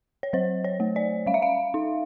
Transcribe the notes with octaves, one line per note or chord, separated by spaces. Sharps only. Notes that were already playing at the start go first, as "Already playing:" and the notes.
C#5
F#3 C5
C#5
A3
D5
G3 F5
E5
F5
D#4